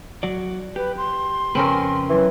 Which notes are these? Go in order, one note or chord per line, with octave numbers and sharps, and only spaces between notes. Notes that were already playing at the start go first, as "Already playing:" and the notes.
F#3 F#4 D5
G4 B4
C6
F2 C#3 C4 C#4 A#4 B4
E3 F#3